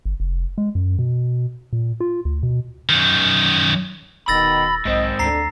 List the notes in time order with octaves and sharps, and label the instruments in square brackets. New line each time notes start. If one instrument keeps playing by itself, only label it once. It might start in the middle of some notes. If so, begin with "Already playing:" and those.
[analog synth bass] G1
F1
G#3
F#2
B2
A#2
F4
D2
B2
[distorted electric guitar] F#2 D#3
[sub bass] D#1 [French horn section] B2 D#3 [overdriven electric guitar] B5 [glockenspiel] E6 A6 A#6
[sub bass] B1 [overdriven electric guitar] G#2 C4 [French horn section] D#5
[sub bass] D2 [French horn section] D3 [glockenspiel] A#5 C7